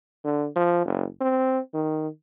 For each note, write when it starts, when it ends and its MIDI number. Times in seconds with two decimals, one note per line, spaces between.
0.25 0.47 50
0.56 0.84 53
0.85 1.07 30
1.21 1.59 60
1.74 2.08 51